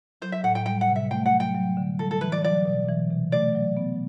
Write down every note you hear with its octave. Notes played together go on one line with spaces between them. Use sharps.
F#3 C5
E5
A2 F#5
G5
G3 G5
F#5
C3
E5
A3 G5
F#5
F#3
G5
F#3
D3
G3 A4
A4
E3 B4
D5
F#3 D5
B2
E3
C3
A3 D5
F#3
B3